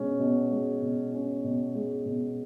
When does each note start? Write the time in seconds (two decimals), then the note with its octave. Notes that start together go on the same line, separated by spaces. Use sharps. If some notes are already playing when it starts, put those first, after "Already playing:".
Already playing: B2 G#3 C#4
0.19 B2
0.51 G#3
0.82 B2
1.13 C#4
1.44 B2
1.75 G#3
2.06 B2